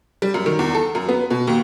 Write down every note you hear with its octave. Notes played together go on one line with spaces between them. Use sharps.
G3
F#2
D#3
E2
A4
F#2
B3
B2
D#2